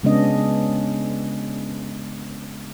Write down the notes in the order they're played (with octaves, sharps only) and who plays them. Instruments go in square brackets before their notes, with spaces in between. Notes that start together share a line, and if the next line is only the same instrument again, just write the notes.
[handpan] C#3 G#3 B3 C#4 D4 D#5